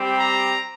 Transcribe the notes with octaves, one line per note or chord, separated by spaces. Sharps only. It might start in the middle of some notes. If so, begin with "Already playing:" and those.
Already playing: G3 C4 G4
A#5